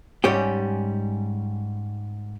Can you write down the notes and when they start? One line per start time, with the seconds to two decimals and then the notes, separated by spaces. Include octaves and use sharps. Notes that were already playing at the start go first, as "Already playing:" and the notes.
0.24 G#2 G3 C#4 G4